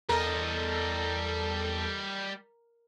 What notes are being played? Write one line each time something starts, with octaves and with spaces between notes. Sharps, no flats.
E2 G3 A4 A#4 D#5